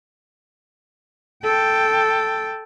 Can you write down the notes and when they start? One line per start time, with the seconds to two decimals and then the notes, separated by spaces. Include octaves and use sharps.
1.43 A4 G5